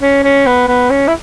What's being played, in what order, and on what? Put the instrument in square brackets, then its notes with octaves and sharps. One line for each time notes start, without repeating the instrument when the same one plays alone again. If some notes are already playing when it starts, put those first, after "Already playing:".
[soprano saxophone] C#4
C#4
B3
B3
C#4
E4